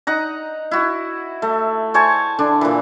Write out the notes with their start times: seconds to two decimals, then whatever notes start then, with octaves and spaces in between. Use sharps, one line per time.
0.07 D#4 F#5 A#5
0.71 E4 F#4
1.42 A3
1.94 C5 C#5 G#5 A5
2.39 D3 D4
2.61 A#2 E3